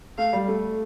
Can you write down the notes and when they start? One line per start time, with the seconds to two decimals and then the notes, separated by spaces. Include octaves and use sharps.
0.18 A3 F5
0.33 G3
0.48 A3